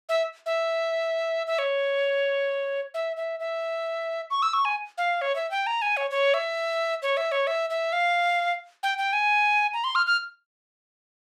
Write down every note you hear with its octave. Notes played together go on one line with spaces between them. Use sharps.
E5
E5
E5
C#5
E5
E5
E5
C#6
E6
C#6
G#5
F5
C#5
E5
G5
A#5
G#5
C#5
C#5
E5
C#5
E5
C#5
E5
E5
F5
G5
G5
G#5
A#5
C6
F6
F6